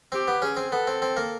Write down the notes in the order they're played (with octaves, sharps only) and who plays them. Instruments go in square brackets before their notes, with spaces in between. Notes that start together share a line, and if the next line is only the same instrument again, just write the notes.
[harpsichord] C4 [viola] G4
[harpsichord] B3
[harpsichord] C#4 [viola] G#4
[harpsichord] C4
[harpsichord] B3 [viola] A4
[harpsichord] C4
C4
A#3